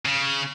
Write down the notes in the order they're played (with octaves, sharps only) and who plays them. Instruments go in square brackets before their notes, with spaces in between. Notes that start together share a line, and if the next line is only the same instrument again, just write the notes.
[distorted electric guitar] C#3